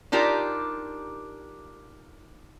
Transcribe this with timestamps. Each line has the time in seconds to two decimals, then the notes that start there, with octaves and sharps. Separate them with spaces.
0.12 D4 D#4 F4 G4 A#4 D5